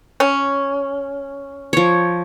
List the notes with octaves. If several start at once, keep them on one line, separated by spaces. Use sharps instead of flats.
C#4
F3 C#5